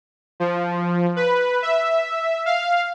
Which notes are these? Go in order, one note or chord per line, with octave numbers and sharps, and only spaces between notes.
F3
B4
E5
F5